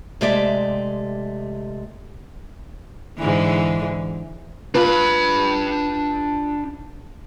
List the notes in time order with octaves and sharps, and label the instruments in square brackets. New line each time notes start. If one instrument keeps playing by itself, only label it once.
[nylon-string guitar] C3 G#3 A3 G4 D5 E5
[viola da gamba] G#2 D3 E3
[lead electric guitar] D4 B5 [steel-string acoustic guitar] F4 B4